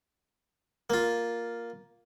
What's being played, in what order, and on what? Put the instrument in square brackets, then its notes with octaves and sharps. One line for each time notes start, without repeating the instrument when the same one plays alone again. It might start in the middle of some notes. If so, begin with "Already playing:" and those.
[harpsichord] A#3 F4